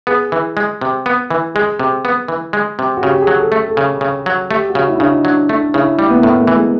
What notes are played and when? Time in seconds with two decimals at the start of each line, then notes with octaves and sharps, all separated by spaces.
0.07 B3 G#4
0.32 E3
0.57 G#3
0.81 C3
1.06 B3
1.31 E3
1.55 G#3 G#4
1.79 C3
2.05 B3
2.28 E3
2.53 G#3
2.79 C3
2.97 F#4
3.03 C#3 G4
3.14 G4
3.22 G#4
3.27 F#3
3.40 A4
3.52 A3
3.68 A4
3.77 C#3 G#4
4.01 C#3
4.26 F#3
4.51 A3 G4
4.70 F#4
4.75 C#3
4.88 E4
4.98 C#3 D4
5.07 D#4
5.25 F#3 D4
5.49 A3 D4
5.74 C#3 E4
5.98 G3 E4
6.10 B3
6.17 A#3
6.23 A2
6.36 A3
6.47 E3
6.55 G#3